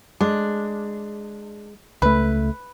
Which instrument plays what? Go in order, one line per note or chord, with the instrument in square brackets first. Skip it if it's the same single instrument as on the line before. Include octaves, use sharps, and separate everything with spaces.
[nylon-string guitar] G#3 [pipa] D4
[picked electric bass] C#2 A3 [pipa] B4